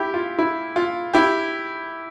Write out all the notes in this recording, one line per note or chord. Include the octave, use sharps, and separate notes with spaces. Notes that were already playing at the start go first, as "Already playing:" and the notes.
Already playing: E4 G4
F4
E4
F4
E4 G4